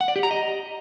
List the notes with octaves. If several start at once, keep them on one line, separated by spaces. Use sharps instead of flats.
F#5
D5
G4
A#5
D#5